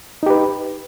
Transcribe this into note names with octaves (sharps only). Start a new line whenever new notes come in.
D#4 G4 B4